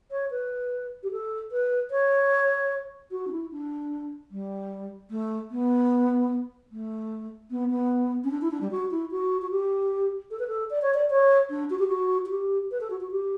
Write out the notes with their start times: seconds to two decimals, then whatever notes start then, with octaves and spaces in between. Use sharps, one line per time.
0.11 C#5
0.31 B4
1.03 G4
1.11 A4
1.51 B4
1.91 C#5
3.11 F#4
3.27 D4
3.32 E4
3.51 D4
4.31 G3
5.10 A3
5.51 B3
6.71 A3
7.50 B3
7.70 B3
8.24 C#4
8.31 D4
8.41 E4
8.51 D4
8.61 G3
8.71 F#4
8.91 E4
9.11 F#4
9.42 F#4
9.51 G4
10.31 A4
10.39 B4
10.48 A4
10.70 D5
10.82 C#5
10.94 D5
11.10 C#5
11.50 D4
11.70 F#4
11.79 G4
11.87 F#4
12.26 F#4
12.30 G4
12.71 B4
12.80 A4
12.90 F#4
13.00 F#4
13.11 G4